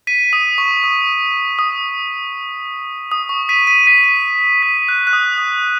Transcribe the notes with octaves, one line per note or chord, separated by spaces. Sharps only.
B6 D#7
D#6
C#6
D#6
D#6
D#6
C#6
B6 D#7
B6 D#7
B6 D#7
B6
F#6
F#6
D#6
D#6